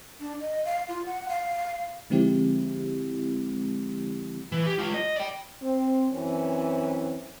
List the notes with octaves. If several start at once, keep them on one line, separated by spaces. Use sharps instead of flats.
D4
D#5
F5
F4
F#5
F5
D3 F3 G#3 C4 E4 G4
E3
G4
G#3 F4
D#5
D5 G5
C4
F#2 E3 C4 C#4